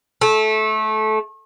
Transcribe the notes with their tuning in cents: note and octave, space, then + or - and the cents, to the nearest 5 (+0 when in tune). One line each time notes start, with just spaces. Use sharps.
A3 -20